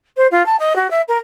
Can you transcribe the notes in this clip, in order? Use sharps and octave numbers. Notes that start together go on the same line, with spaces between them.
C5
F4
A5
D#5
F#4
E5
A#4